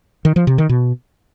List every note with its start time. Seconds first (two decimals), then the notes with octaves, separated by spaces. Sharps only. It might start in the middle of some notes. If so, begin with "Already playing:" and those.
0.25 D#3
0.36 F3
0.47 C3
0.58 D#3
0.69 B2